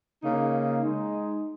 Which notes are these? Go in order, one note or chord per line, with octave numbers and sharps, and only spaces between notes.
C#3 A#3 D#4
G#3 D#4